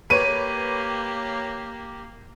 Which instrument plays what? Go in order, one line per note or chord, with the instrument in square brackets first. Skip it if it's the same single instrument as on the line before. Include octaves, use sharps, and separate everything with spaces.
[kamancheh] A#3 G4 [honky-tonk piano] B4 C#5 [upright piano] D#7